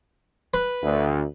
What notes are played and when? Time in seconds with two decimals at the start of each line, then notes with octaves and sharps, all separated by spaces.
0.54 B4
0.83 D2